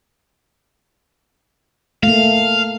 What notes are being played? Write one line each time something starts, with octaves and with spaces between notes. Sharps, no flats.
A3 A#3 F5